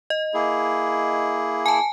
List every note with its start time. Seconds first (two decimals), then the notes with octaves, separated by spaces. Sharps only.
0.10 D#5
0.34 A#3 E4 G#4
1.66 G#5 A5